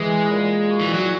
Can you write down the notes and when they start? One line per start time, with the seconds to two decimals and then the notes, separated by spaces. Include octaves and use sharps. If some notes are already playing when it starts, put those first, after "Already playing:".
Already playing: E3 G#3
0.30 A#2
0.69 F#4
0.81 E3
0.94 F#3